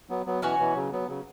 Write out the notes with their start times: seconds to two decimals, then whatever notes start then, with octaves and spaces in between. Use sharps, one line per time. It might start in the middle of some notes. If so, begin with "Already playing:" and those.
0.10 F#3 B3
0.26 F#3 B3
0.42 B2 E3 C#4 F#4 C#5 G#5
0.59 B2 E3
0.75 C#3 F#3
0.92 F#3 B3
1.08 C#3 F#3